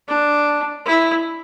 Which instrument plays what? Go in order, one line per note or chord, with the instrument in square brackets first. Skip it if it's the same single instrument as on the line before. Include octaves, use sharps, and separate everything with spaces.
[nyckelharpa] D4
E4